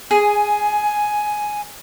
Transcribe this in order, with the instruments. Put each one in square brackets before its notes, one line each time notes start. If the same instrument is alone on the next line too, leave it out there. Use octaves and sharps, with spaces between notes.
[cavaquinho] G#4 [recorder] G#5